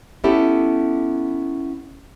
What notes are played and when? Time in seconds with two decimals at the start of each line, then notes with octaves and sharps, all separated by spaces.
0.24 B3 C#4 E4 G4 A4